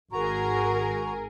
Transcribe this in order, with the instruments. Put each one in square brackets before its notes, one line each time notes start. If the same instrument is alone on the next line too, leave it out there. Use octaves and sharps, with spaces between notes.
[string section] G#1 G#4 A#4 [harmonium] F#4 A#5